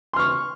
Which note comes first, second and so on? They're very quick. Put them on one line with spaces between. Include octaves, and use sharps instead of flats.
C6 F6 C#6